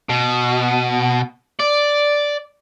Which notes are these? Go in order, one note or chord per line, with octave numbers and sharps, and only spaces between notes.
B2
D5